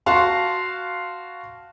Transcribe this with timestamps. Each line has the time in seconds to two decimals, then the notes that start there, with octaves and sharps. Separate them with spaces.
0.06 F#4 F5 A5 C6 C#6